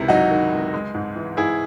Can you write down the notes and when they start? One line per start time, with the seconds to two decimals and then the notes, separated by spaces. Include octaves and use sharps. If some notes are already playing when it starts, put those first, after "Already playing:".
Already playing: C#2 C3 D#3 E4
0.08 F#3 D#4 F#4
0.31 D#3
0.52 C#2
0.74 G#3
0.95 G#2
1.16 E3
1.37 G#2 E4 G#4